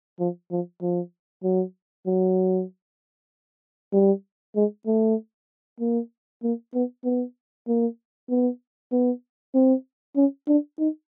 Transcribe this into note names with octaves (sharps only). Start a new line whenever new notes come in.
F3
F3
F3
F#3
F#3
G3
G#3
A3
A#3
A#3
B3
B3
A#3
B3
B3
C4
C#4
D4
D#4